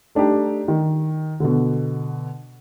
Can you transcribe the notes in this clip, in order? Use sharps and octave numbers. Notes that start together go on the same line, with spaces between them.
A3 D4 D#4 G4
D#3
B2 D3